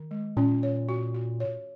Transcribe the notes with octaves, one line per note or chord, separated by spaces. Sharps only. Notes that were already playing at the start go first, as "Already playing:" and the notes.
Already playing: D#3
G#3
A#2 C#4
C#5
F#4
F#4
C#5